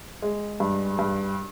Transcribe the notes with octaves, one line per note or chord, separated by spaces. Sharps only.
G#3
G2
G2